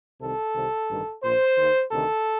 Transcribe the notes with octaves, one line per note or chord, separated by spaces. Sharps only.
C2 C3 D#3 A4
C2 C3 D#3
A1 G2 D#3
A#1 A#2 C5
D#2 D#3
D2 C3 D#3 A4